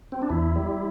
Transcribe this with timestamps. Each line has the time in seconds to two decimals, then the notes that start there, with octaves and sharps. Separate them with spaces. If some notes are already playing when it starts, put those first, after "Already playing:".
0.12 C4
0.22 D4
0.30 E2 E4
0.56 G3